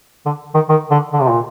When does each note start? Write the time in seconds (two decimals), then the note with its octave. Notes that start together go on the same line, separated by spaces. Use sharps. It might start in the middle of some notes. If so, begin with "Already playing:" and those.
0.25 D3
0.54 D#3
0.69 D#3
0.91 D3
1.13 D3
1.21 C3
1.30 A#2